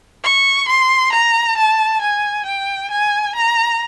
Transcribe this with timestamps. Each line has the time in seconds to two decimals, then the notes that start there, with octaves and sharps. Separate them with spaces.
0.24 C#6
0.68 C6
1.13 A#5
1.57 A5
2.01 G#5
2.46 G5
2.90 G#5
3.35 A#5